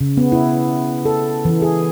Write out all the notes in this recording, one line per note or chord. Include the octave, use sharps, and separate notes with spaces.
C#3
B3
E4
A4
E3
G#4